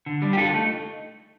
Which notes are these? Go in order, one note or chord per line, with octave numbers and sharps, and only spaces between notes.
D3
G3 D4
G4
D3 F4 A4
A3 D#4